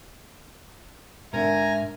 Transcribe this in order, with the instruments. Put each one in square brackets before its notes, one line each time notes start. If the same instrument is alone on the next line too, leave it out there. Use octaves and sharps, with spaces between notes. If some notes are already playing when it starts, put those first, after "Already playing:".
[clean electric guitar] G#2 [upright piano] D3 A#4 [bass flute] E5 [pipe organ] G#5 A#5